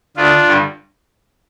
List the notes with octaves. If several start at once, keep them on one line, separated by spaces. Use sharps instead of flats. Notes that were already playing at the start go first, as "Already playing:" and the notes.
D2 D3 D4 F4
G2 D3